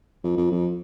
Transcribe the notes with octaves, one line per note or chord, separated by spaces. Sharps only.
F2
F2
F2